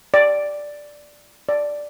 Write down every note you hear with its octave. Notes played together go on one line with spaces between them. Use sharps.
D5
D5